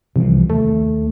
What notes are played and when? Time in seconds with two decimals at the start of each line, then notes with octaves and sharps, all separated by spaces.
0.16 C2 C3 E3 F3
0.50 D#2 A3